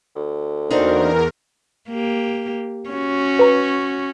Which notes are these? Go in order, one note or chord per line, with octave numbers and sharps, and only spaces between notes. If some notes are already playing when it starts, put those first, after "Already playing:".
D2
E2 A#3 C4 D4 D#4 F#4 A#4 C5
A#3 G4
C#4 F#4
B4 A#5